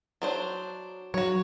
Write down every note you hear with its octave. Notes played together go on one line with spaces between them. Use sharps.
F#3 D4 C5
F#3 F#4 C#5